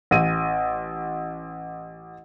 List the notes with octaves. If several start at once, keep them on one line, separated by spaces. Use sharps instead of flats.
A1 D#7